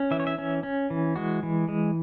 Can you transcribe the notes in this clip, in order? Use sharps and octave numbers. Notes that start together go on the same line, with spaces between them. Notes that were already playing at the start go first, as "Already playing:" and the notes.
Already playing: C#4
E3 E5
C#5
E5
C#4
C#4
E3
G#3 F#4
E3
G#3